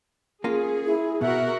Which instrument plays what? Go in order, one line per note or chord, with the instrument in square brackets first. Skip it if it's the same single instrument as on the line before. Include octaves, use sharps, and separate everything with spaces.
[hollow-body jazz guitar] A#3 C#4 F4 [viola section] G#4
[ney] E4
[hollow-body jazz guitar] B2 [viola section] F#4 A#4 F#5 [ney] E5